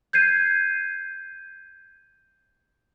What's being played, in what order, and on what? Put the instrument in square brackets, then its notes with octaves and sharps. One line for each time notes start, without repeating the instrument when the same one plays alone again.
[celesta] G6 G#6 C7 D#7